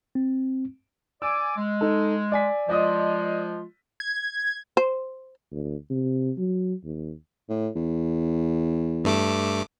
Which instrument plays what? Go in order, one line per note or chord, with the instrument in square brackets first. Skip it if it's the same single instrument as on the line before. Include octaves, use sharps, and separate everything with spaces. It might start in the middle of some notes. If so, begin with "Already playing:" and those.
[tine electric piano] C4
[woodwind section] D5 G#5 D6 [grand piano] E6
[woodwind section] G#3
[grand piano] D#4 A4
D5 G#5 B6
[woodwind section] F3 G#3 F4 [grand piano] D5 D#5 D#6
[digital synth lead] G#6
[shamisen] C5
[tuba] D2
C3
F#3
D#2
[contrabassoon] A2
E2
[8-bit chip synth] G2 A3 D6